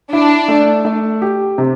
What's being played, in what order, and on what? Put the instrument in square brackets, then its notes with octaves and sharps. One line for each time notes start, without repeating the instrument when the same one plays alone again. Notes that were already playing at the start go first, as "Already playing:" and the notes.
[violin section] D4 [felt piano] E4
[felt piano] A3
A3
G4
C3